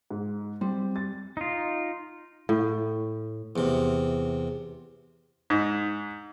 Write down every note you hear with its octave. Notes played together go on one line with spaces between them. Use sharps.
G#2
G3 C4
A6
D#4 F4
A2
E2 C3
G#2